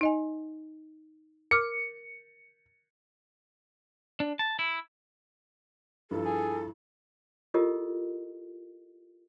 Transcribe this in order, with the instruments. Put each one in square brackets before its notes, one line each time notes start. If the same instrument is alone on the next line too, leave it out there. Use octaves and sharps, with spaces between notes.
[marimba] D#4 D#5 G#5
[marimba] A#4 D6 F6 [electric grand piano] C#7
[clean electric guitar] D4
A5
E4
[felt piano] G2 F3 [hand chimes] E4 [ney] A4
[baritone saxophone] G#4
[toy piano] E4 F4 G4 A4 A#4 D#5